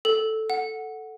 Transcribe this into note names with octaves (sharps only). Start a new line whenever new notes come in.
A4
F#5